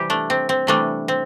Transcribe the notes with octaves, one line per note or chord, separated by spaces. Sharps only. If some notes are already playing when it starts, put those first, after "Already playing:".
Already playing: C3 E3 G3 G4
A3 D4
C4
C4
C3 E3 G3 A3 D4
C4